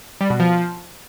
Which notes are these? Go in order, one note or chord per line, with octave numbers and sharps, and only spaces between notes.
G3
B2
F3